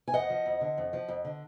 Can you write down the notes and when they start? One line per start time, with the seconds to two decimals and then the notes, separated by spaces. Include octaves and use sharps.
0.08 G#5
0.14 F2 D#5 F#5
0.30 F3
0.46 F2
0.61 D3
0.78 F2
0.93 F3
1.08 F2
1.25 D3